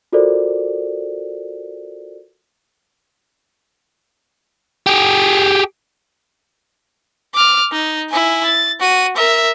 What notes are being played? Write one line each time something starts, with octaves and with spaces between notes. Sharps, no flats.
F4 F#4 A4 A#4 C5 D5
G4 G#4
D6 F6
D#4
E4 G#5
A6
F#4 D#7
A#4 E5